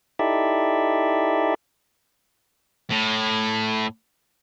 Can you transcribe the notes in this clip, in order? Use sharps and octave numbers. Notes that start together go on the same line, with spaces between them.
D#4 E4 G4 A4 D5 E5
A2